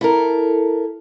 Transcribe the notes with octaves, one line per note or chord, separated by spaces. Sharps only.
E4 A4 A#4